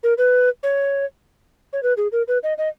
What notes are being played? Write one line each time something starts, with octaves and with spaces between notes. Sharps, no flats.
A#4
B4
C#5
C#5
B4
G#4
A#4
B4
D#5
D#5